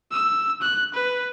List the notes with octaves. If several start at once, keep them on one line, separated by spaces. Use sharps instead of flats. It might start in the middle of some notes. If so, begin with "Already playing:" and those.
E6
F#6
B4